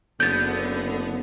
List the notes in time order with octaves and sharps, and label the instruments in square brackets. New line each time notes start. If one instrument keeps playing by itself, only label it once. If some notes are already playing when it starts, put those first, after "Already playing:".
[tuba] F#1 [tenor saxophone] D3 [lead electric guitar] B3 [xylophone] G6 A6